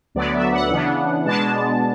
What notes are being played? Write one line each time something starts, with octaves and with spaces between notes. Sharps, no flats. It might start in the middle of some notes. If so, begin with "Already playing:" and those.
D2 D3 F#3 B3 D5
E5
F#5
C#3 E3 B3 D4
B2 G#3 B3 D4 A5